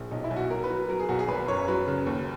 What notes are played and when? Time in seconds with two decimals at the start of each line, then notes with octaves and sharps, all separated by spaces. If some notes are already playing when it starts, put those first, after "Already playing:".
Already playing: A#1
0.11 B1 D#4
0.24 E4
0.31 B1
0.36 F#4
0.50 F#3 A#4
0.64 B4
0.70 F#3
0.89 F#3 A#4
1.00 G#4
1.09 B1 F#4
1.19 G#4
1.28 G#1 B4
1.48 F#2 C#5
1.68 F#3 B4
1.88 C#3
2.07 D#2